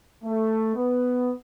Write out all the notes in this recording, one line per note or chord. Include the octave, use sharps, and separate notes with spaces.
A3
B3